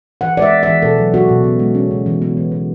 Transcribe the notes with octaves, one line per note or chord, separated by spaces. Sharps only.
E3 F#5
G#3 D5 E5
B3
E3 E5
B2 A4
F#3
B3 F#4
B2
C#3
G#3
C#4
C#3
E3
B3
E3
B3